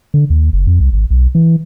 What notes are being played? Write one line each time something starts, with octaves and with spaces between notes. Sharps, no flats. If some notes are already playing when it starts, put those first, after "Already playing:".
D3
D#2
F#1
F2
C2
G#1
B1
E3